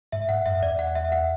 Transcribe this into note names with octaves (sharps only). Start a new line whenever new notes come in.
G#2 E5
G#2 F#5
F#2 E5
E2 D5
F#5
E5
F#5